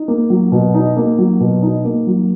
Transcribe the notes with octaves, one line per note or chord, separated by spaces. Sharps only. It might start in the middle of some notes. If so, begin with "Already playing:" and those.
Already playing: D#4
A#3
F#3
B2
D#4
A#3
F#3
B2
D#4
A#3
F#3